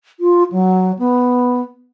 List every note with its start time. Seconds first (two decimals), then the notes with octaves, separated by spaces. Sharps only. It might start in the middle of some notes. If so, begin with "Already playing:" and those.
0.20 F4
0.52 F#3
0.99 B3